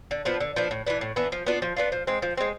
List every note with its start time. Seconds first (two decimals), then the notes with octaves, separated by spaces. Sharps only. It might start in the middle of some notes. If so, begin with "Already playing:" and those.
0.11 D3
0.25 F3 B3 D4
0.40 D3
0.56 F3 B3 D4
0.71 A2
0.86 E3 B3 D4
1.01 A2
1.16 E3 B3 D4
1.32 F3
1.46 B3 D4 F4
1.62 F3
1.77 B3 D4 F4
1.92 F3
2.07 G#3 C4
2.22 F3
2.37 G#3 C4